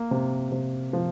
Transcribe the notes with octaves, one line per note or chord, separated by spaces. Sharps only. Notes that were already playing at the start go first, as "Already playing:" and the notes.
Already playing: A#3
C3
C3
F3